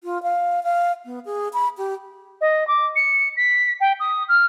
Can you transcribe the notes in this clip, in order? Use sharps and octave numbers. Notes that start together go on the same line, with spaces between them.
F4
F5
F5
B3
G#4
B5
G4
D#5
D6
C#7
B6
G5
D#6
F6